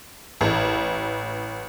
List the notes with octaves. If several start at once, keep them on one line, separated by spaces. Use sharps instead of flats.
A1